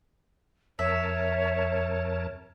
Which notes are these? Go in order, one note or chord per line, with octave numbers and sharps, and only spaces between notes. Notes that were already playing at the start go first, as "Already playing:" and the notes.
F2 A#4 C#5 E5 A5